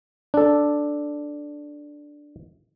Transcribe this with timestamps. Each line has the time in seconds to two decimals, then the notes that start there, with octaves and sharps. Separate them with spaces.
0.34 D4 A4